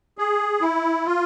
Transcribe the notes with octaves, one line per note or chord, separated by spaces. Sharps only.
G#4
E4
F4